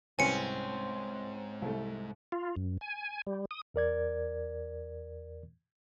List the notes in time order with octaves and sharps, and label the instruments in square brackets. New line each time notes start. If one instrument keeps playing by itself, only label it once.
[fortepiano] C2 B4 C#5 [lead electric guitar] G#2 [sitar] C4 C#4 [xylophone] G#5 C#7
[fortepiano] C2 A3
[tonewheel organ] F4
F#2
G#5
G3
D#6
[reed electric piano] E2 A#4 D5 G#6